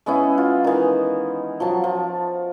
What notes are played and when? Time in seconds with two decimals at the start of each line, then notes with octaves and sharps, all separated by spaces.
0.06 G#3 B3 C#4 E4
0.38 F4
0.64 D#3 E3
1.60 F3 F#3 A5
1.84 F3